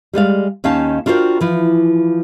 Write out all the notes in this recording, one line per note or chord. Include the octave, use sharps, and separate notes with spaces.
G3 G#3 D5 F5
D#2 D#3 C#4 F5 G#5 A5
D4 F4 F#4 A#4 C5 G5
E3 F3